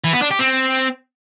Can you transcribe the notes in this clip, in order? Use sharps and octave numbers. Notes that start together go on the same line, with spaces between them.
E3
B3
D4
G4
C4